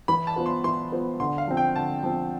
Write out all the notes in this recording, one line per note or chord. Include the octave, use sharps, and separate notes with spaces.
E3 B5
A5
B3 F4 C5
C6
E3 C6
B3 F4 C5
D3 C6
F5
F3 C4
G5
D3 A5
F3 C4